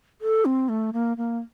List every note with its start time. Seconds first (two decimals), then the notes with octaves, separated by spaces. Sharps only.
0.21 A4
0.45 C4
0.69 A3
0.93 A#3
1.17 A#3